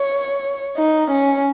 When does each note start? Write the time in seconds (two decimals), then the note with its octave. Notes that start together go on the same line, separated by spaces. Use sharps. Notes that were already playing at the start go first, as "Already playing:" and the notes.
Already playing: C#5
0.77 D#4
1.11 C#4